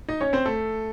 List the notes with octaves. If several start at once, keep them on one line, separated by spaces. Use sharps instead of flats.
D#4 D#5
C#4 C#5
C4 C5
A3 A4